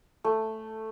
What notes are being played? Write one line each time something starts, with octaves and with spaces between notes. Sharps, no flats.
A3